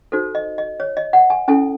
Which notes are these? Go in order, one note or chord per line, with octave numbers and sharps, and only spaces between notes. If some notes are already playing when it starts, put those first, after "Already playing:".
D#4 F#4 A4 C5
D#5
D#5
C#5
D#5
F#5
G#5
C#4 E4 A4 G#5